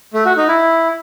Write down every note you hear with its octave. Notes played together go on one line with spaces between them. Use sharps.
A3
F#4
D#4
E4